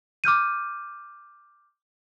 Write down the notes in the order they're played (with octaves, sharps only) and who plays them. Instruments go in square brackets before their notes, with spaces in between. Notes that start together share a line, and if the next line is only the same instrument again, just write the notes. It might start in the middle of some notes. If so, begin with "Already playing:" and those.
[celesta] D6 F6 G6 D#7